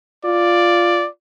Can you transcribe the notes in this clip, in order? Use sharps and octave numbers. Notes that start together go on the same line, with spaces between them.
F4 D5